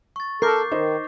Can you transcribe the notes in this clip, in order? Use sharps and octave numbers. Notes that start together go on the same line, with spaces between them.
C#6 A6
A4 A#4 D6 G6 C7
D#3 D#4 C5